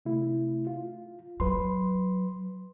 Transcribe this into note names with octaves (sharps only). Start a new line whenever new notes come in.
C3 A3 E4
F4
F#3 B4 C6